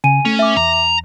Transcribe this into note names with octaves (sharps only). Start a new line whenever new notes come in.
C#3 G#5 D#7
A3 C#4
E5 D6
E2 A#5